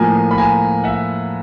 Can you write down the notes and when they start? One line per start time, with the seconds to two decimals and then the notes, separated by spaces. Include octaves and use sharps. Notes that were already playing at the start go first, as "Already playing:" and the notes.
Already playing: A2 F3 A#3 G#5 A#5
0.31 B5
0.38 G#5 A#5
0.84 E5 F#5